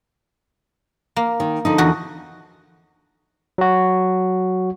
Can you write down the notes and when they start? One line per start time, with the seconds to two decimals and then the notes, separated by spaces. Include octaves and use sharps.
1.16 A#3
1.40 D#3
1.65 D3 F3 D#4
1.78 E2 F#4
3.58 F#3 F#4